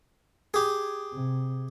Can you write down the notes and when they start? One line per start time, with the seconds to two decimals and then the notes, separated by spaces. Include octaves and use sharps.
0.54 G4 G#4
1.13 C3